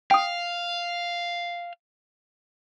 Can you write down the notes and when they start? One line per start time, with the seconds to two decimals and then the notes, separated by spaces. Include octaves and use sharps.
0.11 F5 G5 D#6